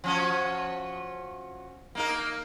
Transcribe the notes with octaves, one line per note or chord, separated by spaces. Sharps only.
F3 C#4 F#4
A#3 D#4 A#4